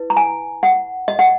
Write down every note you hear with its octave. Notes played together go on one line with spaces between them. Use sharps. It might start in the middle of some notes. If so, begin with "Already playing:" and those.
Already playing: E4 B4
A#5
G#5
F#5
D#5
F#5